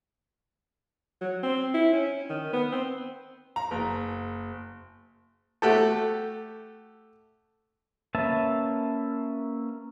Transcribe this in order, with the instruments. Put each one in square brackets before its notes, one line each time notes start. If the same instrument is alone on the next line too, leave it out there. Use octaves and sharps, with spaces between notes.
[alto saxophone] F#3
C4
E4
C#4
D#3
B3
C4
[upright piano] A#5
F#1
[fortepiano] A3 F#4 G4 A4
[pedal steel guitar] A#3 C#4 B4 E5 A5